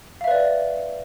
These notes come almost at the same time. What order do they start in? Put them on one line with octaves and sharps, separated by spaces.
F5 E5 B4 D5